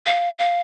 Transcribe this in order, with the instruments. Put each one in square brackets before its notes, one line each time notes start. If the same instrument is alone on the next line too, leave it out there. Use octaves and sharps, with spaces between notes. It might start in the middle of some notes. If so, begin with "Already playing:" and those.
[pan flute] F5
F5